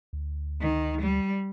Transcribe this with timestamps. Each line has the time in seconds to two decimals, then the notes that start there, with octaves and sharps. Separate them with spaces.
0.13 D2
0.61 D#3
1.01 G3